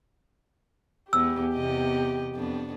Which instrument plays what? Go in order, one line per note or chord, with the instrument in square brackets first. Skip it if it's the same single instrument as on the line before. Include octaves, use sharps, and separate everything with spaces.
[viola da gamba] E2 [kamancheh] G4 [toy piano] E6
[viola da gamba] E2 C3 D#5
F2 B3 D4